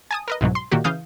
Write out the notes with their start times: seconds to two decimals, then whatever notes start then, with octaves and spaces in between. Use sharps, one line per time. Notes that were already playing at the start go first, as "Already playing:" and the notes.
0.11 G#5 A5 D#6
0.28 A#4 B4 D#5
0.41 C2 G#2 B2 F#3
0.55 C6
0.71 A#2 D#3 A#3 F#4 G4
0.84 C#3 E3 F5 D#6 G6